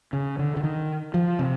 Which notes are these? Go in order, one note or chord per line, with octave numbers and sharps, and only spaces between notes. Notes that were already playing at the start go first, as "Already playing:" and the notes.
C#3
D3
D3
D#3
F3
C3